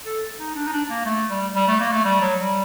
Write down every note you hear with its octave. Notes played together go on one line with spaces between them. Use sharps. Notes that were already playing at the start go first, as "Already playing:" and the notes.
A4
D#4
D4
D#4
D4
A#3
A3
G3
G3
A3
A#3
A3
G3
F#3
G3